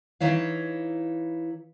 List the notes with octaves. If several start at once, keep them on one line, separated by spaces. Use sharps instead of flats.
E3 D#4 E4 C#5 F5